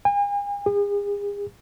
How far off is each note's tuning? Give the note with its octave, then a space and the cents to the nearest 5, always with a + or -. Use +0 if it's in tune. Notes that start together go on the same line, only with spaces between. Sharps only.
G#5 -40
G#4 -40